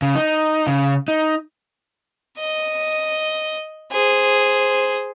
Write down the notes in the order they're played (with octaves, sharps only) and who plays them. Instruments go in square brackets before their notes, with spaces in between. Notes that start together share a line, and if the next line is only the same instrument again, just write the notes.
[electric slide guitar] C#3
D#4
C#3
D#4
[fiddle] D#5
G#4 C5